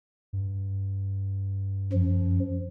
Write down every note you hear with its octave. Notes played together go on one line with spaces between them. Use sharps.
G2
F#2 F3